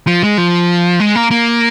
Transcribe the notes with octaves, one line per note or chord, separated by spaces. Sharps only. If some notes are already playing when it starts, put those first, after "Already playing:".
F3
G#3
F3
G#3
A#3
A#3